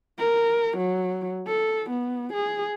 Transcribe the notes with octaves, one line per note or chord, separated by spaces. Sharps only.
A#4
F#3
A4
B3
G#4